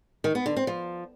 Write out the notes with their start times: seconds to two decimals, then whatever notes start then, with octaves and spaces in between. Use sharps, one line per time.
0.24 D#3
0.35 B3
0.46 D3
0.56 C4
0.67 F3